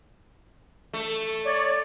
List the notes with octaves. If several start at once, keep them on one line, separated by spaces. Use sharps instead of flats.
A3
C#5 D5